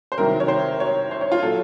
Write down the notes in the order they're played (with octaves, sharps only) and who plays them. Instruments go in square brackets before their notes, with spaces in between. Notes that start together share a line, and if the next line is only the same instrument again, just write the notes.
[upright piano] C5
C2 C3 D#3 F#3 A#4
C#5
C5
C#5
C5
C#5
F4
A#2 F#3 A4